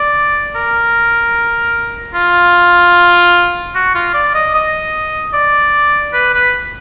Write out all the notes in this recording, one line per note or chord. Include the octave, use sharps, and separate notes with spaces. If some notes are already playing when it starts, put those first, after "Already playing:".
Already playing: D5
A#4
F4
F#4
F4
D5
D#5
D#5
D5
B4
B4